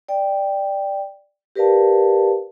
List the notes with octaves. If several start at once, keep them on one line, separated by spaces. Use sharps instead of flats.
D5 G5
G4 A#4 B4 D5 F5 A5